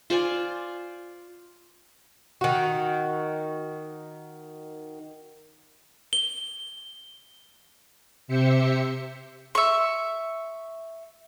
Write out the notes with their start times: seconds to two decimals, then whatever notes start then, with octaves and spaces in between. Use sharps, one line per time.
0.10 F4 C5 D5 G#5
2.41 D#3 F#4
6.13 G7
8.28 C3 G4 C5 E5 C#7
9.55 E5 C#6